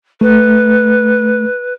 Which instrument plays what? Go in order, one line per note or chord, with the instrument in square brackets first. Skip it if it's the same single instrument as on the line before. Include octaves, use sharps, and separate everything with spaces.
[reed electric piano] A3 [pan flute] B4